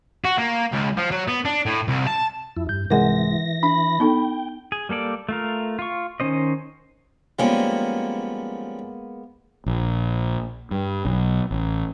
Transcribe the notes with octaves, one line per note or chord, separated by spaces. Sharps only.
F#4
A#3
C#2
F3
F#3
B3
D4
A2
C2
A5
F2 E4
G2 G6
C2 G#2 E3 G#3 A#4 F#5 A#6
D4 B5
B3 D#4 A4 G5
G#4
G3 A#3 A4 D5
A3 F4 A#4
F4 C#6
D#3 C4 C#4 C5 D#5
F3 G3 G#3 A#3 B3 C#4
A#1
G2
B1
A1